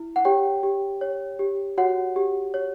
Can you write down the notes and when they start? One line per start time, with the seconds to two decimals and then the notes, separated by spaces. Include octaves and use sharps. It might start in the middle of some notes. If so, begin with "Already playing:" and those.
Already playing: E4
0.16 F#5
0.25 G4 C#5 G5
0.63 G4
1.01 C#5
1.39 G4
1.78 F#4 C#5 F#5
2.16 G4
2.54 C#5